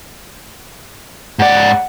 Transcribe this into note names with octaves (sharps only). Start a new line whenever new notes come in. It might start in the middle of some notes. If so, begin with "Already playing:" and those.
G#2 D5 F#5